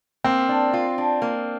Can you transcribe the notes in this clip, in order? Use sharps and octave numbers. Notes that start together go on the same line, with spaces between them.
A#3 C4
D4
F4
D4
A#3